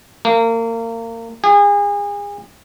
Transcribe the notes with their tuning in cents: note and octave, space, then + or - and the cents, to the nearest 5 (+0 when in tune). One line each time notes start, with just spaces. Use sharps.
A#3 -30
G#4 -35